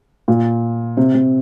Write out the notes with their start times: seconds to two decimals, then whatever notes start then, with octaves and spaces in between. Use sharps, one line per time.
0.28 A#2
0.97 C3
1.14 C3